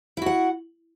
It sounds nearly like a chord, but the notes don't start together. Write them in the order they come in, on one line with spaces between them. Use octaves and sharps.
E4 F#4 F#5